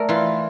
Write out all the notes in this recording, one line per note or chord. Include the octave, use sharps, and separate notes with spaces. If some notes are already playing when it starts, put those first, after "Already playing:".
Already playing: A3 A#4 D5
E3 F4